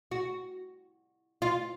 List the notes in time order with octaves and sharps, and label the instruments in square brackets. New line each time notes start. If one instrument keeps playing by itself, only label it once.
[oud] F#4
F4